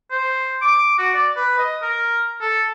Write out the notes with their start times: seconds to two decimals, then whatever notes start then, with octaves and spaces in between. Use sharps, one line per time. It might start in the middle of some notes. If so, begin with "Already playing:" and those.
0.11 C5
0.62 D6
0.98 F#4
1.14 D5
1.36 B4
1.59 D#5
1.83 A#4
2.41 A4